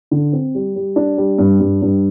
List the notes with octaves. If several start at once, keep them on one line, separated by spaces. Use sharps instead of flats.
D3
C4
G3
G3
D4
G3
G2
G2
G2